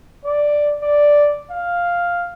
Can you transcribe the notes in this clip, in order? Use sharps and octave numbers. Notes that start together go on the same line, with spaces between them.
D5
D5
F5